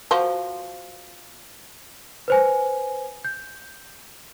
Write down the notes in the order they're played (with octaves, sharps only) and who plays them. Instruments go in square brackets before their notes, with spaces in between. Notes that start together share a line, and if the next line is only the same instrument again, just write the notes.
[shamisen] F3 F#4 C5
[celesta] B4 C5 G#5
G6